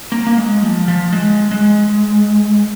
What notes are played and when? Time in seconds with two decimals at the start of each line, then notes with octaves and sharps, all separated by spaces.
0.12 A#3
0.27 A#3
0.38 G#3
0.62 F3
0.88 F3
1.13 G#3
1.51 G#3